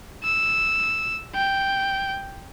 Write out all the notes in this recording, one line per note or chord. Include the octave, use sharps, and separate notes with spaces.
E6
G5